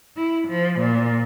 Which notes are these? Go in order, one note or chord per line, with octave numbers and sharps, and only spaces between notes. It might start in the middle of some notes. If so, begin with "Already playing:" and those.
E4
F3
A#2